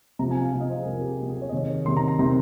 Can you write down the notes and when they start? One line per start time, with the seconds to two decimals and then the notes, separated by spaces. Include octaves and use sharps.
0.19 C3 A#5
0.23 F3
0.31 G#5
0.41 F5
0.52 C3 F3 F5
0.61 D#5
0.70 C5
0.77 G#4
0.86 C3 A#4
0.89 F3
1.01 G4
1.08 G#4
1.19 C3 F3 G4
1.30 G#4
1.42 C#5
1.49 D#5
1.53 C3 D#3 C#5
1.85 C3 D#3 C6
1.97 A#5
2.08 A#5
2.19 C3 D#3 C6